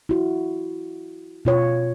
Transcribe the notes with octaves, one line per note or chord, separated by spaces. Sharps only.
E4 F#4
B2 F4 C#5